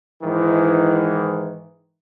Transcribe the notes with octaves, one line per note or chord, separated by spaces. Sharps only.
G#2 D#3 E3